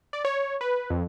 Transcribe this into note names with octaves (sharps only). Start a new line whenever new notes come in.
D5
C#5
B4
F2